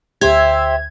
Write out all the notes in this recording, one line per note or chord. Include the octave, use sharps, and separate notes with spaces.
D2 G4 C5 E5 G#6